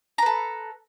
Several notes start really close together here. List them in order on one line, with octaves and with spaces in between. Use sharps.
A#5 B4 A4